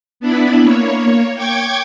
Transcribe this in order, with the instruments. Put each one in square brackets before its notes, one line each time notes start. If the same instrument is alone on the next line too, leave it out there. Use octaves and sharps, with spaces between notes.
[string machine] B3 D4 E4 B4
A#3 C#5
G5 C#6 D6 G#6